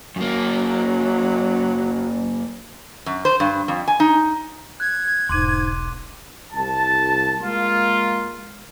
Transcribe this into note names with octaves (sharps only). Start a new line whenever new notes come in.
F#2 F#3 A#3
F#2
C5
G2
F2
G#5
D#4
F#6 G#6
E1 B1 G#2 C6 D6 D#7
C2 A5
G#3 A#3 F4